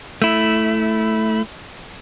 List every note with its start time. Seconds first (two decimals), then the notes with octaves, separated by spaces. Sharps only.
0.22 A3 E4